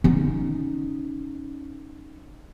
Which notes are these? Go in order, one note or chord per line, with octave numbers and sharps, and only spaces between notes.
C#4 D#4